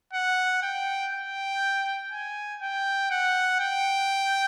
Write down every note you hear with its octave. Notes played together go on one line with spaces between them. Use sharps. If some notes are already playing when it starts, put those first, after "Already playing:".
F#5
G5
G5
G#5
G5
F#5
G5